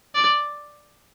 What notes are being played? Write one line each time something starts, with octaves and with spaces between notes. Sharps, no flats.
D5